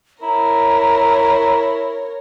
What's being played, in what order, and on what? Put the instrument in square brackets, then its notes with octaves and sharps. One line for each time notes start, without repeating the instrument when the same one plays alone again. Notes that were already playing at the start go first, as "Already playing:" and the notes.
[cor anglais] E4 [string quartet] A#4 C#5 [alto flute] A#5